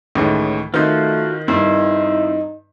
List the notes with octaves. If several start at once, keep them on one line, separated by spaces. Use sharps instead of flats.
C#2 A2 D#3 E3 G#3
D#3 A3 C4 D#4 F4 F#4 G6
G2 C4 D#4 E4 C5